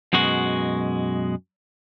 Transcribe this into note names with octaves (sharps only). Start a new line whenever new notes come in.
F#2 B2 G#3 F#4